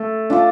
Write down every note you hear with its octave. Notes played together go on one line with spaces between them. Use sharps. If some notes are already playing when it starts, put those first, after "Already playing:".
Already playing: A3
D4 F4 A4